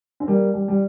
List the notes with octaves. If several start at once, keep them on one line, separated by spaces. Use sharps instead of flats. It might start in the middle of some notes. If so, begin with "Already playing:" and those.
C4
G3 A#3
G3
G3